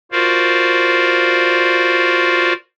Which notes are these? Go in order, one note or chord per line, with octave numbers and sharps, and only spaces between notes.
F4 F#4 A#4 C5 D5 F5